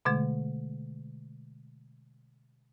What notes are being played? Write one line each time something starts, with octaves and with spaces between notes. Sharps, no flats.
B2 D3 G#3 A3